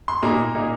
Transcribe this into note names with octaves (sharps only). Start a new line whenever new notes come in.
C6
A#2 A#3 D#4 A#5
A#2 A#3 D#4